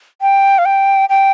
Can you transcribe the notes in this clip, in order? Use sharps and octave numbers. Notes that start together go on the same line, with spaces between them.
G5
F5
G5
G5